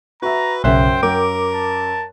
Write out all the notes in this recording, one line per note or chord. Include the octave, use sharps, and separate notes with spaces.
F#4 B4 E5 A#5
B1 F#2 C#3 C5 E5 G5 F#6
F#2 A#4 D6
A5